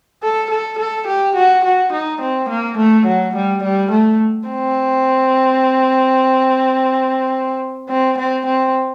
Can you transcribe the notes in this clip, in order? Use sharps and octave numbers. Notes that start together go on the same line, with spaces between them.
A4
A4
A4
G4
F#4
F#4
D#4
C4
A#3
A3
F#3
G3
G3
A3
C4
C4
C4
C4